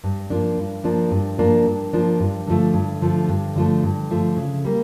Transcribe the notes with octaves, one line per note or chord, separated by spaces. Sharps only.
G2
F3 A#3 D4
G2
F3 A#3 D4
G2
F3 A#3 D4
G2
F3 A#3 D4
G2
D3 F3 A3
G2
D3 F3 A3
G2
D3 F3 A3
G2
D3 F3 A3
C#3
G3 A#3